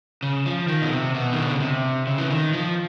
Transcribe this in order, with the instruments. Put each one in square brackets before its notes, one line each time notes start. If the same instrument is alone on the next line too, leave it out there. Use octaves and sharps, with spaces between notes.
[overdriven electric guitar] C#3
F3
D#3
B2
C3
B2
D#3
D3
C#3
C3
C#3
E3
D#3
F3